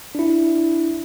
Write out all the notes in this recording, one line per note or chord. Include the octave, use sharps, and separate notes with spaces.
D4 E4